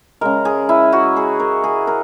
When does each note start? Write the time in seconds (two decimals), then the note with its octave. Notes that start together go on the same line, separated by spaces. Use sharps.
0.21 C#3 G#3 A#4
0.45 G#4
0.69 E4
0.92 F#4
1.16 G#4
1.40 A#4
1.64 G#4
1.87 A#4